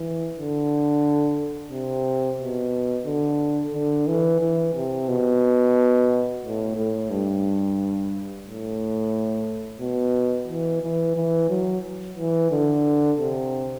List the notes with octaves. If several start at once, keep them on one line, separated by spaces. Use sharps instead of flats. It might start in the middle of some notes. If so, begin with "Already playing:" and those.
Already playing: E3
D3
C3
B2
D3
D3
E3
E3
C3
B2
A2
A2
G2
A2
B2
E3
E3
E3
F#3
E3
D3
C3